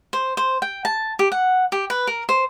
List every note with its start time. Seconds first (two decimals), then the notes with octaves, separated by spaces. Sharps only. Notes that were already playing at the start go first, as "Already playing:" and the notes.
0.13 C5
0.37 C5
0.62 G5
0.85 A5
1.19 G4
1.32 F#5
1.72 G4
1.90 B4
2.07 A#4
2.29 C5